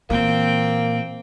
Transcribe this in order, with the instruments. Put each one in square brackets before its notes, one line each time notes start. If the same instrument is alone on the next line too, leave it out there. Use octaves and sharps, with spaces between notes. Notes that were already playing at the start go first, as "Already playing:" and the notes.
[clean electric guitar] A#2 [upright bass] E3 [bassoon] A#3 [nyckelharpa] C4 G5